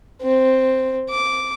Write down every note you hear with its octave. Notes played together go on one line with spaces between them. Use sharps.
C4
D6